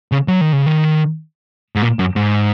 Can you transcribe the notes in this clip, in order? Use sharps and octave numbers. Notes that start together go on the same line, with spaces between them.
C#3
F#3
D#3
C#3
D#3
G#2
A#2
F#2
G#2